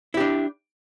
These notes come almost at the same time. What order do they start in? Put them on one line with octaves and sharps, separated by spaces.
E4 G4 D4